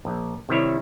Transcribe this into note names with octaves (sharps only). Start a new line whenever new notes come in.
A#1
C3 D#3 G3 E4 C#5